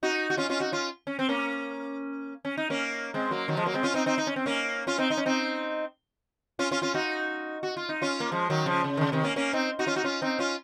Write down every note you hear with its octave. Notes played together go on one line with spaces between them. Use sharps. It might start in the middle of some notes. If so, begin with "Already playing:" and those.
D#4 F#4
F#4
C#4 F4
C#4 F4
D#4 F#4
C#4 F4
C#4
C4
A#3 C#4
C#4
D#4
A#3 C#4
G#3 C4
F#3 A#3
D#3 F#3
F3 G#3
F#3 A#3
G#3 C4
C#4 F4
C4 D#4
C4 D#4
D#4
C#4
C4
A#3 C#4
C#4 F4
C4 D#4
D#4
C#4
C4 D#4
C#4 F4
C#4 F4
C#4 F4
D#4 F#4
F#4
F4
D#4
C#4 F4
A#3
F3 G#3
D#3 F#3
C#3 F3
C#3
D#3
C#3
C3 D#3
A#3 C#4
A#3 C#4
C4 D#4
D#4 F#4
C#4 F4
D#4 F#4
C#4 F4
C4 D#4
C#4 F4